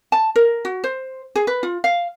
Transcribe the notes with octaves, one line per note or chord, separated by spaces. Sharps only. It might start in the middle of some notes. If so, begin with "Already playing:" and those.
A5
A#4
F#4
C5
G#4
B4
F4
F5